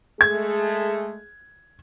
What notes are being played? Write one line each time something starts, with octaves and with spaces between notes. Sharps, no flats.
G#3 A3 G#4 G#6